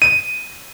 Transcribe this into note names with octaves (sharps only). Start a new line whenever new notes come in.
D#7